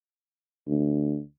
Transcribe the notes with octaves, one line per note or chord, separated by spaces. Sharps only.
D2